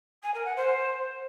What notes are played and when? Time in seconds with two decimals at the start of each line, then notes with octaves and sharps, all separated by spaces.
0.23 G#5
0.34 A#4
0.45 F#5
0.56 C5